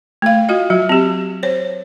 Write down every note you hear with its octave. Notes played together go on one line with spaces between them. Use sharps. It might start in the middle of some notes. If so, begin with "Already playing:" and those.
A3 F5
F4 F#4 D#5
F#3 F#4
C4 G4
C5 C#5